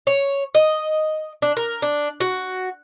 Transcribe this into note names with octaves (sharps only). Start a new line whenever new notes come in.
C#5
D#5
D4
A#4
D4
F#4